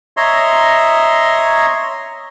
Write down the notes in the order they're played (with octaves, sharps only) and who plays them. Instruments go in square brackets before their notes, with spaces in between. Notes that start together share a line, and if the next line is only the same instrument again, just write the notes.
[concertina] C#5 D#5 E5 A#5 C6